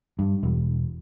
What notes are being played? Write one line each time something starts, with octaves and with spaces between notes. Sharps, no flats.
G2
E1